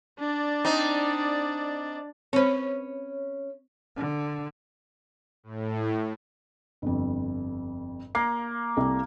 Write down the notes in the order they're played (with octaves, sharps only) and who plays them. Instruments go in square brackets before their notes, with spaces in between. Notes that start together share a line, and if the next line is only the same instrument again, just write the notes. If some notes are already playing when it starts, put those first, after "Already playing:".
[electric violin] D4 D5
[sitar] C4 D#4
[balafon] C4 C5 [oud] C#4 B4
[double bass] D3
[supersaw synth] A2
[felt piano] G1 F2
[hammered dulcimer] A#3 [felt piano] C7
[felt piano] C2 A4